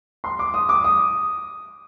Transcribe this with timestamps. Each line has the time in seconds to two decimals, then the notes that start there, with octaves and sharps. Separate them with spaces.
0.24 C6
0.39 D6
0.54 D#6
0.69 D6
0.84 D#6